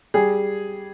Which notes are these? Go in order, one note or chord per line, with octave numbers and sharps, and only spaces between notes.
G3 G#4